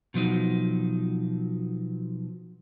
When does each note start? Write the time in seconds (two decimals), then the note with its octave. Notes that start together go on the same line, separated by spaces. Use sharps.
0.14 B2 F3 F#3 D#4